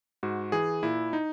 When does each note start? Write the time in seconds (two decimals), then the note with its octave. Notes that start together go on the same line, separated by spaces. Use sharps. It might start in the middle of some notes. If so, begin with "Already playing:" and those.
0.23 G#2 F#4
0.52 E3 G#4
0.83 A#2 E4
1.13 D#4